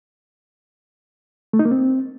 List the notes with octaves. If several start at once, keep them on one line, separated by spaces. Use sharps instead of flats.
A3
D#4
A#3
C4